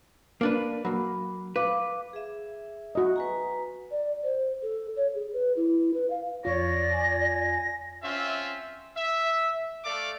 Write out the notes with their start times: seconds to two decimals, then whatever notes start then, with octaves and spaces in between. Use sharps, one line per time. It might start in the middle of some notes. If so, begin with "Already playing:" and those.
0.41 A#3 D4 B4
0.85 F#3 A#3 B5
1.56 B4 F5 D6
2.13 G#4 E5
2.95 F#4 D#5
3.16 B4 G#5 A#5
3.91 D5
4.24 C5
4.63 A4
4.97 C#5
5.15 G#4
5.33 B4
5.57 E4
5.94 B4
6.10 F5
6.45 F2 F4 C#5 D5 A#6
6.92 G#5
8.03 C4 C#4 F4 E5
8.96 E5
9.84 A3 A4 D5 F5 D6